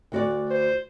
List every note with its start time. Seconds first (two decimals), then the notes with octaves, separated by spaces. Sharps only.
0.12 D2 F#4 D5
0.50 C5